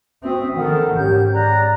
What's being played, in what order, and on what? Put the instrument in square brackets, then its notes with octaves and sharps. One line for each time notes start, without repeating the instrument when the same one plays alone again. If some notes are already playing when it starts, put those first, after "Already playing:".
[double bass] C4 [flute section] F#4 E5 D#6
[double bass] D#3 [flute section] A4 A#4 F#5
[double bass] G#2 [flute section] C#4 G4 G6
[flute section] D5 A#5 F#6